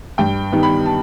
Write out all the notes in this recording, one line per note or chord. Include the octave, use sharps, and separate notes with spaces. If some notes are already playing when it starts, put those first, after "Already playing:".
G2 G5
D#3 G3 B3 D#4
B5
A5